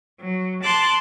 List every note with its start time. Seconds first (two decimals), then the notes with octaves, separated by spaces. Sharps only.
0.20 F#3
0.63 A5 C6 D6 F#6